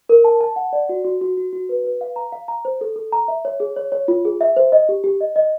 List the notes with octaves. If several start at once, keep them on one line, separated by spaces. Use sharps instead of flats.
A#4
A5
A5
F#5
D5
F#4
F#4
F#4
F#4
F#4
B4
B4
F5
A#5
F5
A#5
C5
A4
A4
A#5
E5
C#5
G#4
C#5
C#5
F4
G#4
E5
C5
D#5
G4
G4
D#5
D#5